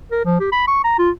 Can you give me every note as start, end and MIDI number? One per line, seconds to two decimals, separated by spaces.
0.11 0.24 70
0.25 0.39 53
0.40 0.49 67
0.52 0.65 83
0.68 0.82 85
0.84 0.95 82
0.98 1.10 65